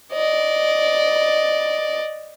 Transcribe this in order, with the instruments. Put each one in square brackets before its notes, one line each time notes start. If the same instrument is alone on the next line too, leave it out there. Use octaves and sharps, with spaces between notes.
[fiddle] D5 D#5